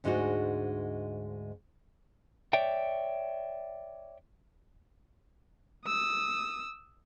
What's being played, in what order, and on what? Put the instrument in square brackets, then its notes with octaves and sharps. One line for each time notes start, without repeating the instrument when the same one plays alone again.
[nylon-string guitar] D2 G#2 G#3 D4 D#4 F#4
[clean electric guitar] C#5 D5 E5 G5
[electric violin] D#6 E6